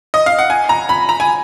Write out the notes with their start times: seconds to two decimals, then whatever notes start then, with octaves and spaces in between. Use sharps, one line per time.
0.14 D#5
0.26 F5
0.39 F#5
0.50 G#5
0.69 A#5
0.89 B5
1.09 A#5
1.20 G#5